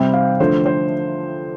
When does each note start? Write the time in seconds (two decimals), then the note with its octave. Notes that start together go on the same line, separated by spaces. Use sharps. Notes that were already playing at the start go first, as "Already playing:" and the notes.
Already playing: C3 G3 C4 G5
0.13 F5
0.40 D3 F3 A3 C5
0.66 C5